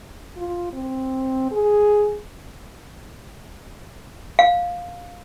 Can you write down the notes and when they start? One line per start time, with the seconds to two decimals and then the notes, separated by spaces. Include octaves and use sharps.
0.37 F4
0.73 C4
1.51 G#4
4.39 F5